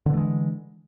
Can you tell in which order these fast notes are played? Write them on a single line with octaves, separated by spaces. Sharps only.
D3 E3 A3 G#3